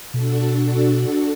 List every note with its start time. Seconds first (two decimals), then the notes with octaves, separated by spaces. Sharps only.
0.14 B2 D4 F#4 A4